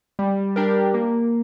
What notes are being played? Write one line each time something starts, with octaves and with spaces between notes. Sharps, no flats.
G3
D4 G4 A#4
A#3